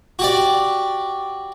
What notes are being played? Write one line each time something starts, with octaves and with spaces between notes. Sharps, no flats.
F#4 G4 D5